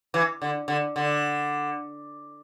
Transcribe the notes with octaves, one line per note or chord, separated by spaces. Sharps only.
E3
D3
D3
D3